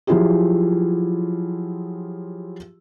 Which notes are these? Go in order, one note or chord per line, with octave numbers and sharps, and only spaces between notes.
F3 F#3 E4 F4 G4 G#4